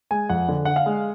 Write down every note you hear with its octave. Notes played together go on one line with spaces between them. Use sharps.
G#3 G#5
F2 F#5
D3
D4 F#5
F5
G#3